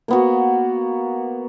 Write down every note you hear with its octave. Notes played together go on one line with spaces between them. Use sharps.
A#3 B3 F#4